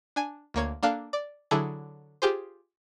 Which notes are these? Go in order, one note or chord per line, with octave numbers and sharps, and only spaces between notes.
D4 G#5
D2 A#3 C#5 G#6
A#3 D4 A4 F5 F#6
D5
D3 F#3 D4 E4 G#4 A4
F4 G4 G#4 C5